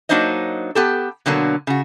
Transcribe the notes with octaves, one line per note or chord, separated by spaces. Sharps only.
F#3 A#3 D4 D#4 C5 D#5
B3 G4 A4
B2 D3 F#3 A#3
C#3 F#4